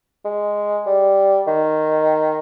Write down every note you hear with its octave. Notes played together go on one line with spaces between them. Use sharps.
G#3
G3
D#3